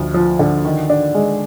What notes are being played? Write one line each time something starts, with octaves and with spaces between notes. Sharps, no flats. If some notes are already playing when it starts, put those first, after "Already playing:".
Already playing: D2 F3
F3
D3
D#3
D4
G#3